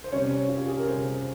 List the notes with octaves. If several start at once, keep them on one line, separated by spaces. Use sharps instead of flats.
C5
C3 G3 C#4 C#5
F4
G4
G#4
A#4
C3 G3 C4 C5